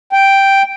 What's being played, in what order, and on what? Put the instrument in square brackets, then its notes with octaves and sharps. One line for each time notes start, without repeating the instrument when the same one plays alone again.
[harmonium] G5